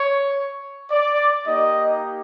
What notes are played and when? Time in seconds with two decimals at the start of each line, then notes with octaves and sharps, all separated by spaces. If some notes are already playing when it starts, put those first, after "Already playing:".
Already playing: C#5
0.91 D5
1.45 A#3 D#4 G4 D#5